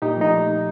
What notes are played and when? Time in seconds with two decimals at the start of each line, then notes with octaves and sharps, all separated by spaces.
0.02 A#2 D#4 G4
0.17 F3 A3 D#4